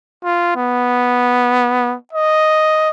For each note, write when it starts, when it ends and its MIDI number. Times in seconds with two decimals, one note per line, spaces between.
0.24 0.55 65
0.56 1.96 59
2.13 2.91 75